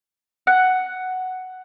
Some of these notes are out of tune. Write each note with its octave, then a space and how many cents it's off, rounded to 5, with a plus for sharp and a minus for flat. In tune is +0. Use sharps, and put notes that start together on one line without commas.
F#5 +5